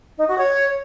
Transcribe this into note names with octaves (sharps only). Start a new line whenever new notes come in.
D#4
F#4
C#5